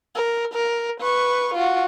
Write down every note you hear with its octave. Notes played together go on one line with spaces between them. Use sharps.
A#4
A#4
B4 C#6
F4 F#4